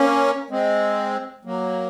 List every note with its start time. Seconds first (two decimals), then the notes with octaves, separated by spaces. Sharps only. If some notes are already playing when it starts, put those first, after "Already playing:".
Already playing: A#3 C#4
0.50 G#3 C4
1.45 F#3 A#3